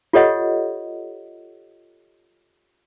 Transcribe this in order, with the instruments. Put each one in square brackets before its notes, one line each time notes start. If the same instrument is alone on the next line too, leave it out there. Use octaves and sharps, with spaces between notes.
[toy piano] F4 G4 A4 C#5 D#5 F#5